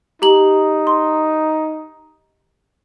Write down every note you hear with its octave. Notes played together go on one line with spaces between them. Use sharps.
D#4 G4 A#5 F#7
C6